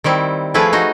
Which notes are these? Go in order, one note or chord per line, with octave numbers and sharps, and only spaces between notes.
D#3 G3 C4 E4
F3 A3 E4 G#4 B4 F5
D#4 F#4 D#5